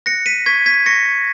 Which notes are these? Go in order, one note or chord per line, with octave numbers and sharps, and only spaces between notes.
F#6 A#6 C#7
B6 D#7
C#6 G#6 B6
G#6 B6
C#6 A#6 C#7